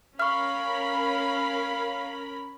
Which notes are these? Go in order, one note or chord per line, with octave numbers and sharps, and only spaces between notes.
C#4 A#4 F5 B5 C#6 F6